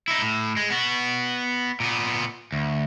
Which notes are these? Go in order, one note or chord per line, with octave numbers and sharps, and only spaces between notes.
D#4 E4
A2
G#3
B3 F#4
A#2 B3
D2